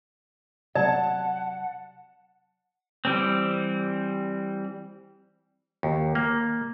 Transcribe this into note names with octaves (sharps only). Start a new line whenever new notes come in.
C3 F#3 D5 F#5 A5
E3 G3 C4
D#2
A#3